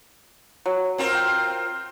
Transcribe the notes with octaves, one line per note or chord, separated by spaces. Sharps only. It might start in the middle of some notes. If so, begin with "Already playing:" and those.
F#3
C4 F4 A#4
G5